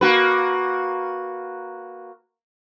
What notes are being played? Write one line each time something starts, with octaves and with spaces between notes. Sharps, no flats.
A#3 F#4 B4